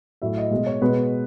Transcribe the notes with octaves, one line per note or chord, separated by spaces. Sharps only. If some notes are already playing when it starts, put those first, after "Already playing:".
A2 F#3 E5
D#5
B2 G#3 D#5
C#5
B2 G#3 B4